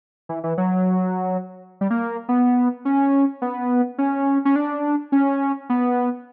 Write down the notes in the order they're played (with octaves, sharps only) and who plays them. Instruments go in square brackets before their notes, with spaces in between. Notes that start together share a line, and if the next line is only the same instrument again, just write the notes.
[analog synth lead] E3
E3
F#3
G3
A#3
B3
C#4
B3
C#4
C#4
D4
C#4
B3